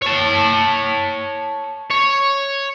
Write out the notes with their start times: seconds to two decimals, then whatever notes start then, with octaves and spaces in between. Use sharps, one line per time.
0.02 C#5 A5
1.91 C#5